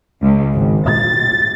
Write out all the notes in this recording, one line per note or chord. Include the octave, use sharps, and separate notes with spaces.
C#2
G#1
A6